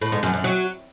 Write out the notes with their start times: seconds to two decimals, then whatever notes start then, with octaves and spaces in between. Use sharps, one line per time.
0.01 A2
0.12 G#2
0.23 F#2
0.33 F#2
0.44 F#3